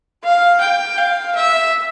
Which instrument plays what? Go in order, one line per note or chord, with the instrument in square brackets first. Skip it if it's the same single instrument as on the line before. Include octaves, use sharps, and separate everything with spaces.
[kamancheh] F5
G5
F5
E5